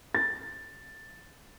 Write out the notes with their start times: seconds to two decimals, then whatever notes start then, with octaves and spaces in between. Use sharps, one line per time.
0.15 A6